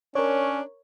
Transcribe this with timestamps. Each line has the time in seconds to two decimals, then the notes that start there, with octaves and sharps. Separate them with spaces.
0.15 C#4 D4 A#4 C#5